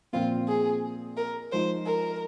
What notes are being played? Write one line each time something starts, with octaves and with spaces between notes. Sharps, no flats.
A#2 F3 C4 F4
G#4
A#4
F3 G#3 D#4 C5
A#4